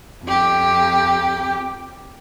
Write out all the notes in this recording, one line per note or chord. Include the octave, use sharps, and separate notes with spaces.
F2 G4